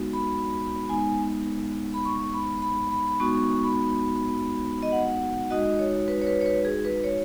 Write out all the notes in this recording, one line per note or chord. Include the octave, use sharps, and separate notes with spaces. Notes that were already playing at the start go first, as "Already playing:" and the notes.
Already playing: G#3 B3 D#4 F#4
B5
G#3 B3 D#4 G#5
B5
C#6
B5
B5
B5
B5
G#3 B3 D#4 F#4 C#6
C#6
C#6
B5
D#5
F#5
G#3 D#4 F#4 D#5
C#5
B4
C#5
B4
C#5
B4
G#4
B4
C#5